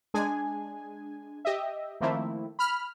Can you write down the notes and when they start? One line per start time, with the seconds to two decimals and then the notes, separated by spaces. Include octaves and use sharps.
0.14 G#3 D4 G#4 G#5
1.45 G4 D#5 E5
2.01 D#3 F3 A3 A#3 C4 E4
2.59 B5 F6